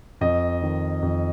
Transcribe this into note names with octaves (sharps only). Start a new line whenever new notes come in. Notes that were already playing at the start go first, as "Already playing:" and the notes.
F2 D#5
D#3
F2